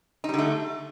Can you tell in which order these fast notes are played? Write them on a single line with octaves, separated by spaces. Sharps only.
D#4 G3 D3 A3